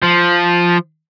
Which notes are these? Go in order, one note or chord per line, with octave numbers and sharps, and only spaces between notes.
F3